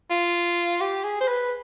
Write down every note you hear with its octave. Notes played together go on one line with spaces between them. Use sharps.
F4
G4
G#4
C5
B4